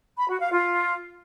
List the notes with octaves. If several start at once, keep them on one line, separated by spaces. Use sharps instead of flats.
B5
F#4
F5
F4